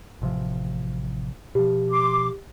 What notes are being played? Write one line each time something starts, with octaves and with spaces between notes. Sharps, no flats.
A1 C3 F3
B2 F3 G4
C6 D6